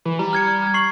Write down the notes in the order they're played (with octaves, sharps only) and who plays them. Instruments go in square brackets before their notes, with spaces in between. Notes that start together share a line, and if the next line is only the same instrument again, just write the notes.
[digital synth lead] E3
[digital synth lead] G3 [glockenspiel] A#5
[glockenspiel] F6 G#6 C#7
F6 G#6
C#6 C7 F#7